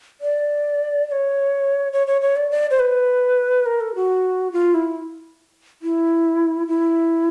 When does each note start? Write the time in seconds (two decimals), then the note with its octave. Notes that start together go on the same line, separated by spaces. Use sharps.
0.21 D5
1.07 D5
1.12 C#5
1.93 C#5
2.07 C#5
2.21 C#5
2.37 D5
2.51 D5
2.71 C5
2.80 B4
3.66 A#4
3.81 A4
3.95 F#4
4.52 F4
4.74 E4
5.82 E4
6.68 E4